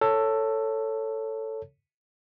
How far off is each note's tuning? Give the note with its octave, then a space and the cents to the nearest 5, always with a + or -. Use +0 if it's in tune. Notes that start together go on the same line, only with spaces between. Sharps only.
A4 +10 C#5 +0